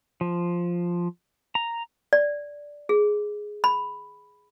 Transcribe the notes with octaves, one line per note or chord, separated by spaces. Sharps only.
F3
A#5
D5
G#4
B5